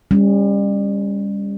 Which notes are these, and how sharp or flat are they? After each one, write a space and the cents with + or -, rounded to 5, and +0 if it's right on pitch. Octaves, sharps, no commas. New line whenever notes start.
G3 +35 C#4 +0